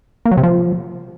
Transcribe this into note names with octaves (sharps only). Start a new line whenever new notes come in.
A#3
F#3
C3
F3